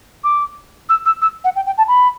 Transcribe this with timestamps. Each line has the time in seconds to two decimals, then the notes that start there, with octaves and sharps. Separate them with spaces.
0.24 D6
0.89 E6
1.06 E6
1.22 E6
1.44 F#5
1.56 G5
1.66 G5
1.78 A5
1.88 B5